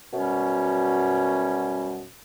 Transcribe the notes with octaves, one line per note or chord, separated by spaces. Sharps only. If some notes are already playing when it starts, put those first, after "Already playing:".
F#2 B2 G3 C#4